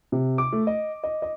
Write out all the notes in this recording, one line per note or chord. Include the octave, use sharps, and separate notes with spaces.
C3
D6
A3
D#5
D#5
D#5